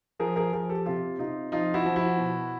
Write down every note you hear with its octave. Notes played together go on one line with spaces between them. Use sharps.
F3 G#4 A#4
G#4 A#4
F3 G#4 A#4
G4 A4
C3 F4 G4
C3 D#4 F4
F3 D#4 F4
E4 F#4
F3
E4 F#4
B2